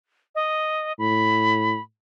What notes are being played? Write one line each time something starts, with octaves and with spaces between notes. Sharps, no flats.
D#5
A2 B5